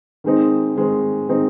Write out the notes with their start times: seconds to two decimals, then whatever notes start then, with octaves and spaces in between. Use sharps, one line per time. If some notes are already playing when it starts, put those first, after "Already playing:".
0.24 D#3 G#3 C4 D#4
0.76 D#3 G#3 C4 D#4
1.28 D#3 G#3 C4 D#4